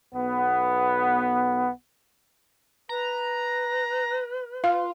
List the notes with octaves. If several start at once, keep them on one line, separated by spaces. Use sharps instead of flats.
B1 B3
B4 A#5
F4 F5